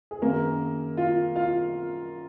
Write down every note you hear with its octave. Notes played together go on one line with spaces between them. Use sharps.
G#4
F#2 D#3 G#3 A#3 A#4
F4 F5
F4 F5